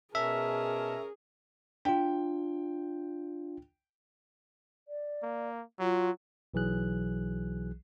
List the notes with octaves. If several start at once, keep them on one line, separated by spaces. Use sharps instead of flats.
B2 C#4 G#4 A#4 E5 A5
D4 F4 G5
D5
A#3
F#3 F4
B1 E3 F#3 G#4 F#6